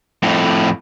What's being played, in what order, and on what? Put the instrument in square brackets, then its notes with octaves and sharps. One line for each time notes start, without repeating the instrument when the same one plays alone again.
[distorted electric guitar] F2 A2